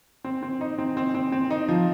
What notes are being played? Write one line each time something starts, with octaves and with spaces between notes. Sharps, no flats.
C4
C4
D#4
C4
C4
C4
C4
D#4
F3